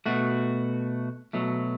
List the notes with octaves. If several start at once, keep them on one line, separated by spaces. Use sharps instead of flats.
B2 A3 F#4
B2 F#3 A3